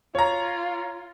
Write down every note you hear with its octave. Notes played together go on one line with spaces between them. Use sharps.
F4 C#5 A#5